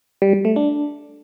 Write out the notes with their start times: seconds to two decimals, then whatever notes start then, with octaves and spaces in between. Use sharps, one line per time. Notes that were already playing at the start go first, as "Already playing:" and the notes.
0.22 G3
0.33 G3
0.45 A3
0.56 D4